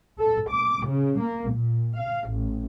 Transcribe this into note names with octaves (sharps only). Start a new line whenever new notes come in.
A4
D6
C#3
A#3
A#2
F5
A1